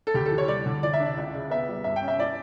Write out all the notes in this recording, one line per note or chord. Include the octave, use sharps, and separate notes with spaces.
A4
D2 G4
A4
E3
C#5
G3 D5
D3
E3 D5
E5
D4
D5
C#2
C#3
B3 E5
G3
G2 E5
G5
C#4
E5
E4 D5